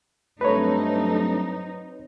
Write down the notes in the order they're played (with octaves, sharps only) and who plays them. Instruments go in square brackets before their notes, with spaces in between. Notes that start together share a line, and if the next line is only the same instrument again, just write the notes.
[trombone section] G2 A3 [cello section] F#3 C4 D#4 [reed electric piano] B4 C#5